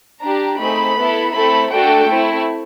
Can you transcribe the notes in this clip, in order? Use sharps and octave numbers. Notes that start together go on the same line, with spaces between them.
D4 G4 A#5
A3 C4 D#4 G#4 B5
B3 E4 A4
A3 C4 E4 A4 B5
A3 D4 F#4 A4 G5
A3 C4 E4